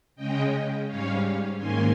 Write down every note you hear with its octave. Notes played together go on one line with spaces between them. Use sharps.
C#3 G#3 C#4 D#5 G5
G#2 G3 C#4 C#5 F5
G#2 D#3 A#3 C#4 G#5 C6